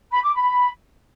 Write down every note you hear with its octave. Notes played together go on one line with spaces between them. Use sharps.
B5
D6
B5